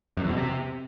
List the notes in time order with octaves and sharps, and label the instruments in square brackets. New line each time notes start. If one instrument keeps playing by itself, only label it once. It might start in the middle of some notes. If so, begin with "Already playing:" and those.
[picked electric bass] F#2
E2
B2
C3